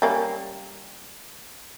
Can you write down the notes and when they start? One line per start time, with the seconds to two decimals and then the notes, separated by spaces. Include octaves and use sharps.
0.02 G3 A#3 C#4